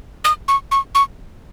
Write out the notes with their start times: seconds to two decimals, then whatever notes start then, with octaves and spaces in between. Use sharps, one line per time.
0.24 D#6
0.48 C#6
0.71 C#6
0.95 C#6